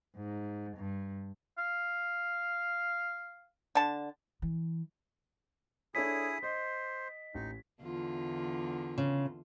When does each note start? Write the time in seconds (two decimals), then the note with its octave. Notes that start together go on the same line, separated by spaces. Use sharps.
0.16 G#2
0.77 G2
1.58 F5
3.75 D3 A5
4.42 E3
5.95 D4 E4 G#4 A4 C#5 D#6 B6
6.43 C5 D#5
7.34 A1 D#4
7.82 E2 D3 F4
8.98 C#3